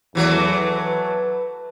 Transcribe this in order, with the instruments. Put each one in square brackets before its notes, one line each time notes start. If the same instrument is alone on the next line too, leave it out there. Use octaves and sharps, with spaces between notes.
[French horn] E2 [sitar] E3 F#3 A3
[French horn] B4
B4